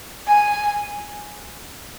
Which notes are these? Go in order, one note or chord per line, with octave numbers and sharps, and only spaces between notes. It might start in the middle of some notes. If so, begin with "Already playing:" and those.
G#5